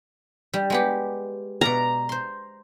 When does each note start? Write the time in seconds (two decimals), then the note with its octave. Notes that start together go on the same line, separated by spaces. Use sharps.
0.54 G3
0.70 G#3 B3 G4
1.61 B2 D5 F5 A#5
2.09 C5 C6